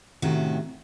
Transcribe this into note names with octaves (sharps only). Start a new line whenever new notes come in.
A2 C3 D#3 A3 C#4 F#4